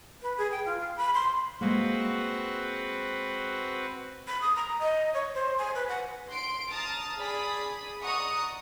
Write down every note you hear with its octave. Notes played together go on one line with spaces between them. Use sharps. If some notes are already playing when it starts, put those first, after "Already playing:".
B4
G#4
G5
F4
F5
B5
C6
G#3 A#3 C4 F#4 B4
B5
D#6
A#5
D#5
C#5
C5
G#5
B4
F#5
C6 D7
A5 A#5 D#6 F6 A6
G#4 D5 B5 D#6
D5 D#5 F#5 A#5 C#6 D#6